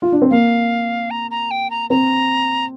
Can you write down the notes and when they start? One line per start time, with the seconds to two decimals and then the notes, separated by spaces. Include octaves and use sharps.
0.02 F4
0.12 D4
0.22 C4
0.31 A#3 F5
1.11 A#5
1.31 A#5
1.51 G5
1.70 A#5
1.90 C4 A#5